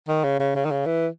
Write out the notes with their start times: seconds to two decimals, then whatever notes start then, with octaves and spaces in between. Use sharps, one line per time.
0.08 D#3
0.24 C#3
0.40 C#3
0.56 C#3
0.65 D#3
0.71 C#3
0.86 E3